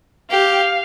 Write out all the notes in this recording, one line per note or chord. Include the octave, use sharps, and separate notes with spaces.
G4 F5